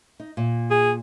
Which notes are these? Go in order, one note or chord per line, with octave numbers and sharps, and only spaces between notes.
D#4
A#2
G#4